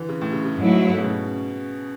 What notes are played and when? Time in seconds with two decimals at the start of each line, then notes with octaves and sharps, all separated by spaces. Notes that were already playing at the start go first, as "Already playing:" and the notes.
Already playing: D3 E3
0.09 C#3
0.21 A2
0.32 C#3
0.45 C#3
0.56 G#2 F#3 A3 E4
0.98 B2
1.03 C#3